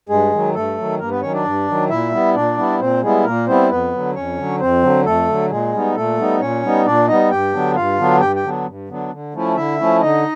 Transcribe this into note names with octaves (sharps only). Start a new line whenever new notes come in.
G2 G#3 G#4
D#3 F#3
G2 A3 A4
D#3 F#3
G2 A#3 A#4
B3 B4
D#3 F#3 C#4 C#5
D4 D5
G2
D#3 F#3
A#2 E4 E5
G3 B3 E4
A#2 D4 D5
G3 B3 E4
A#2 C4 C5
G3 G#3 B3 E4 G#4
A#2 A#3 A#4
G3 B3 C4 E4 C5
F2 B3 B4
D3 F#3
F2 C#4 C#5
D3 F#3
F2 C4 C5
D3 F#3
F2 A3 A4
D3 F#3
A#2 G#3 G#4
G3 B3 D#4
A#2 A3 A4
G3 B3 D#4
A#2 C#4 C#5
G3 B3 D#4
A#2 D4 D5
G3 B3 D#4 D#5
G2 G4 G5
D3 F#3 B3 D4
G2 F4 F5
D3 F#3 B3 D4
G2 G4 G5
G4 G5
D3 F#3 B3 D4
G2
D3 F#3 B3 D4
D3
F3 A3 C#4 E4
D3 E4 E5
F3 A3 C#4 E4
D3 D#4 D#5